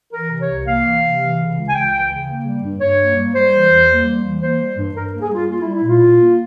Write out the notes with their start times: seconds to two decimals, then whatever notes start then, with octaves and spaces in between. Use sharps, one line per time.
0.13 E3 A#4
0.31 C3
0.40 C#5
0.49 C2
0.66 A#3 F5
0.85 E3
1.02 C3
1.20 E3
1.38 C#3
1.56 C#2
1.68 G#5
1.74 C#2 G5
1.91 E3
2.10 C#3
2.27 A#3
2.45 G3
2.63 G2
2.81 G2 C#5
2.99 A#3
3.16 G3
3.34 G3 C5
3.52 E3
3.70 E2
3.88 A#3
4.05 G3
4.23 E3
4.41 A#3 C5
4.59 G3
4.76 G2
4.95 G2 A#4
5.12 A#3
5.21 G#4
5.30 G3 F4
5.48 A#3 F4
5.61 E4
5.66 G3
5.75 E4
5.84 A#2 F4
6.02 A#2
6.20 A#3